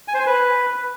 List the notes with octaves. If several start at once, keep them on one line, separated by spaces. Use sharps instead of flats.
G#5
C5
G#5
B4